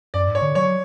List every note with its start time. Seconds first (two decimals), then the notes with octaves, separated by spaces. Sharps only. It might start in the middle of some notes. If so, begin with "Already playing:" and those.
0.14 F#2 D5
0.28 G#2
0.35 C#5
0.41 D3
0.55 F#3 C#5